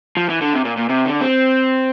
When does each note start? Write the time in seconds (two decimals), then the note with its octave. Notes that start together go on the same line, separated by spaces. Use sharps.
0.17 F3
0.30 E3
0.41 D3
0.54 C3
0.65 A#2
0.77 A#2
0.89 C3
1.06 D3
1.21 C4